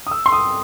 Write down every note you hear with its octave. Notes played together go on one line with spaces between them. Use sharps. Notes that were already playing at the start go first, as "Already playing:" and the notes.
D#6
E6
C6
D#6